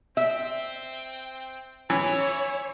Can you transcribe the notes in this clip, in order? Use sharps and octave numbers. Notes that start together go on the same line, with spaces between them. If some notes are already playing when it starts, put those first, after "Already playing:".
C4 E5 G5
E3 E4 C#5